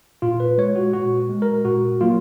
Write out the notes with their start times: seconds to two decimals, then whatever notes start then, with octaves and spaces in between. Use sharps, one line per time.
0.22 A#2 F4
0.40 B4
0.58 G#3 C#5
0.76 F#4
0.93 A#2 F#4
1.29 G#3
1.42 A#4
1.65 A#2 F#4
2.01 F#3 A#3 F4